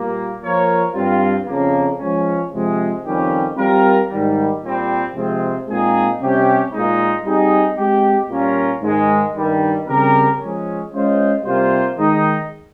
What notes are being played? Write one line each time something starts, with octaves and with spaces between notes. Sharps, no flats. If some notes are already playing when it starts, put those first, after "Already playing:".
Already playing: A#2 G3 A#3
F3 A#3 F4 A#4 C#5
G2 G3 C4 F4
F2 C#3 F3 A#3
F3 G#3 C#4
C3 F3 G#3
F2 D#3 G3 C#4 G4
G3 C4 F4 A#4
G#2 D#3 G3
A#2 G3 C4
C3 F3 G#3 C4 F4
A#2 G#3 C4 D#4 G#4
C3 G3 C#4 G4
A#2 G#3 D#4
G3 C4 D#4 G#4 D#5
G#3 C4 G4
A#2 G3 C#4 F4 A#4
G#2 D#3 G#3
G2 D#3 G3
C#3 G3 C4 G4 A#4
F3 G#3 C#4
G#3 C#4 F4 C5 D#5
C3 G3 A#3 F4 C5
D#3 G#3 D#4